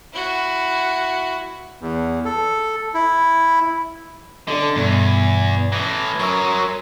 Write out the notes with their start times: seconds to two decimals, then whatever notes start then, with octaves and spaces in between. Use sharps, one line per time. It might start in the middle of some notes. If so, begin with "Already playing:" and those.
0.13 E4 F#4
1.81 E2
2.25 A4
2.94 E4
4.48 D3 D4 A4 D#5
4.76 E2 G2 B2
5.72 A2 E3 D#6 A#6
6.19 F#3 A#4 C6 D#6 E6